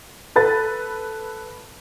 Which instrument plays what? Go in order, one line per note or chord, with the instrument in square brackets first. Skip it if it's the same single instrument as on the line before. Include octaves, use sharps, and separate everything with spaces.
[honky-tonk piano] A4 B4 A6